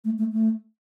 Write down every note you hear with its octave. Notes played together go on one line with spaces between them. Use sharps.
A3
A3
A3